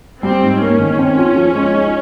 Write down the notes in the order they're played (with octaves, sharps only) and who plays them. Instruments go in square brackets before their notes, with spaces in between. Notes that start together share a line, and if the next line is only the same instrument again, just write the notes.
[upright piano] G3 [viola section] C4
[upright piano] G#2
[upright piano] A#3 [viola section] C#4
[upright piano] D#3
C4
F3
F3
G#3
D#4